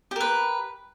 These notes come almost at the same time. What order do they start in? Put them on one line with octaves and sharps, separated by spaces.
G4 A#4 B4